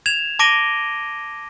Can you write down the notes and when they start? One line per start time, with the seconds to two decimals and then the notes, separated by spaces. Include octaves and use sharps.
0.06 G#6 E7 F7
0.39 A5 D6 A#6 D7 D#7 G7